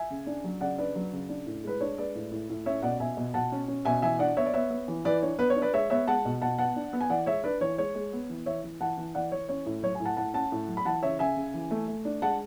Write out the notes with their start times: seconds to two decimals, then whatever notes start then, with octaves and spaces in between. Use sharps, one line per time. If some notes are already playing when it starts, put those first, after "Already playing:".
Already playing: E5 G#5
0.10 C#3
0.27 D4
0.44 F#3
0.61 C#3 D5 F#5
0.78 D4 B4 D5
0.95 F#3
1.13 C#3
1.29 D4
1.46 A2
1.64 G#3 B4
1.81 D4 C#5
1.97 G#3 B4 D5
2.15 A2
2.32 A2
2.50 A2
2.66 C#4 C#5 E5
2.82 B2 D5 F#5
3.00 B2 E5 G#5
3.17 B2
3.34 B2 F#5 A5
3.52 C#4
3.68 C#4
3.85 B2 E5 G#5
4.02 E3 E5 G#5
4.19 D4 D5 F#5
4.37 B3 C#5 E5
4.46 D5
4.54 B3 C#5 E5
4.70 B3
4.88 E3
5.05 E3 B4 D5
5.22 D4 C#5
5.39 B3 B4
5.50 C#5
5.56 D4
5.62 B4 D5
5.73 G#3 C#5 E5
5.90 B3 C#5 E5
6.08 G#3 F#5 A5
6.25 B2
6.41 B2 F#5 A5
6.59 B3 F#5 A5
6.76 D4
6.93 B3
7.01 G#5
7.10 E3 D5 F#5
7.26 G#3 C#5 E5
7.44 D4 B4 D5
7.61 E3 C#5
7.78 G#3 C#5
7.95 G#3
8.13 B3
8.29 E3
8.46 E3 C#5 E5
8.64 E3
8.80 E3 F#5 A5
8.97 E3
9.15 E3 D5 F#5
9.32 E3 C#5
9.49 C#4 C#5
9.66 A2
9.83 F#3 C#5
9.95 A2 G#5
10.05 F#5 A5
10.17 A2 F#5 A5
10.34 C#4 F#5 A5
10.52 A2
10.68 F#3
10.77 B5
10.85 E3 F#5 A5
11.03 C#3 C#5 E5
11.19 C#3 E5 G#5
11.36 C#3
11.54 E3
11.71 A3
11.88 A3
12.05 D4
12.22 G#3 F#5 A5